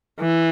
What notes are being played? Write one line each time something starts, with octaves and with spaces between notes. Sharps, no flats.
E3